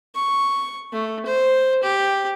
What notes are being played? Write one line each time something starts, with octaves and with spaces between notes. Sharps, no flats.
C#6
A3
C5
G4